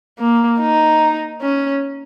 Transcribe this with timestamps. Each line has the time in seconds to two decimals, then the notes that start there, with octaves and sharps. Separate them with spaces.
0.19 A#3
0.60 D#4
1.41 C#4